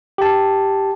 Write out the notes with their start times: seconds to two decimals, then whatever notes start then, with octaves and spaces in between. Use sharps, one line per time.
0.18 G4 A5